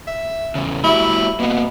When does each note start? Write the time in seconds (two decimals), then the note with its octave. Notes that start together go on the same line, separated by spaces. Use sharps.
0.07 E5
0.55 E2 C#3
0.84 A3 E4 F#4 G4 E5 B5
1.40 B2 A#3 B3